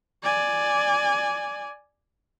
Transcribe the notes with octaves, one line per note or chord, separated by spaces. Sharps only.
D5 G#5